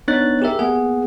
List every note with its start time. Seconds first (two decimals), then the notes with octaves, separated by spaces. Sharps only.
0.08 B3 D4 D#4 C#5 F#6 A6
0.42 G4 G#4 A#4 E5
0.59 A#3 B3 G#4 F#5